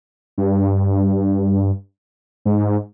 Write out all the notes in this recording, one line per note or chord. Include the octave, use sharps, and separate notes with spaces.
G2
G#2